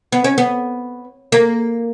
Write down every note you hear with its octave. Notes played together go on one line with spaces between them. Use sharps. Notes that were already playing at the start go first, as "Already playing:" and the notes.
B3
C#4
B3
A#3